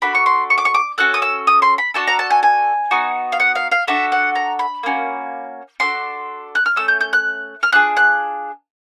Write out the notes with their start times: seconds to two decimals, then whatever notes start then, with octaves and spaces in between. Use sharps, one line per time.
0.02 D4 F#4 A4 B5
0.15 C#6
0.26 C6
0.50 C#6
0.58 D6
0.65 C#6
0.74 D6
0.98 C#4 F#4 A4 F#6
1.14 D#6
1.22 E6
1.47 D#6
1.62 C6
1.78 B5
1.94 D4 F#4 A4 A5
2.07 A#5
2.19 A5
2.30 G#5
2.43 G#5
2.91 B3 D#4 F#4
3.32 F5
3.40 F#5
3.55 F5
3.72 F5
3.87 D4 F#4 A4 E5
4.12 F#5
4.35 A#5
4.59 B5
4.83 A#3 C#4 F#4
5.80 D4 F#4 A4 C6
6.55 F#6
6.66 F6
6.76 A3 C#4 E6
6.88 G6
7.01 G6
7.13 F#6
7.63 F6
7.73 D4 F4 G#4 F#6
7.97 F#6